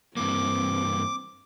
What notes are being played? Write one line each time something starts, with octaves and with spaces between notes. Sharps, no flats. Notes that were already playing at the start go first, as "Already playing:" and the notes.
G2 E3 A#3 C4 D6